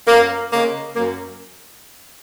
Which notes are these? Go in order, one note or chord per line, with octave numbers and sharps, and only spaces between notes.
F#2 A#3
C#3 G#3 A#3
F#2 A#3